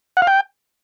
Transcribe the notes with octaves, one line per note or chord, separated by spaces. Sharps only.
F#5
F5
G5